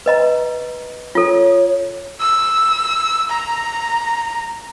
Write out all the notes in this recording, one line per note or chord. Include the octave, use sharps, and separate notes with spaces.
B4 D#5 A#5
F4 A4 C#5
E6
A#5